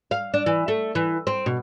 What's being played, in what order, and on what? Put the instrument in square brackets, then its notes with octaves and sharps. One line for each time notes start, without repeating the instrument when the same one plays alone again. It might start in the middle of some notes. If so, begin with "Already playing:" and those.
[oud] F5
D4
E3
A3
E3
C4
B2